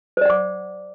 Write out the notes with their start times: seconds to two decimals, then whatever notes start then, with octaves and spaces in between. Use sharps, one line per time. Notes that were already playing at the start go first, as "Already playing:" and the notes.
0.17 C5
0.21 D5
0.25 F#5
0.30 D6